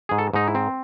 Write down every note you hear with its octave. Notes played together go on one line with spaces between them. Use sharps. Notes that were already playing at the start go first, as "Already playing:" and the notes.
G#2 G#4
A4
G#2 D#4
E4
C4